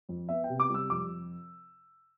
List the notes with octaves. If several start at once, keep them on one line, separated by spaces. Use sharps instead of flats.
F2
B3 E5
G5
C3
D6
G3 E6
F2 D6